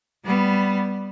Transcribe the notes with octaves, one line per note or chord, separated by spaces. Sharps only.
G3 B3